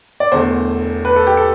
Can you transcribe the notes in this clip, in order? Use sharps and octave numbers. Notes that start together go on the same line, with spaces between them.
D5
E1 E2 D3 A3 C5
B4
A4
G4
A4